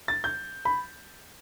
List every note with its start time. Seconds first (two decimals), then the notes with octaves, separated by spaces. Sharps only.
0.08 A6
0.24 G6
0.65 B5